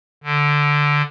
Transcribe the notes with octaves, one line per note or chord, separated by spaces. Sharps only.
D3